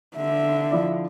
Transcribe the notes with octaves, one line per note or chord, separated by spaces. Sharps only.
D3 E5
F3 E4 D5